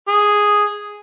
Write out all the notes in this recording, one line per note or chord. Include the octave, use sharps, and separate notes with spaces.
G#4